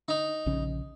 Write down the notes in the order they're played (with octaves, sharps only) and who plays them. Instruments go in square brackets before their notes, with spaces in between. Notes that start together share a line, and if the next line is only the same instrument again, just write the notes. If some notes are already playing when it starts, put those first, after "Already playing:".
[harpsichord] D#4
[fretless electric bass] A#1 C#3 C#4